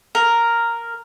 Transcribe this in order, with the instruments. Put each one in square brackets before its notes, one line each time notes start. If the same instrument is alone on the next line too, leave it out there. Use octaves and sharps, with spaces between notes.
[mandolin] A#4